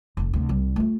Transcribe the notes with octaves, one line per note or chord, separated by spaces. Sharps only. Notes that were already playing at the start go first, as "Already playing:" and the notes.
F1 F2
D2 C3
C2 G3
A3 F4